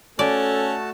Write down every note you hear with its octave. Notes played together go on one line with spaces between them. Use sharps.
A3 C#4 F#4 A4 D5 A5